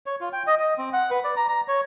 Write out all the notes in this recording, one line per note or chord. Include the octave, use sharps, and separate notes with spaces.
C#5
F4
G5
D#5
D#5
C4
F#5
B4
D5
A#5
A#5
C#5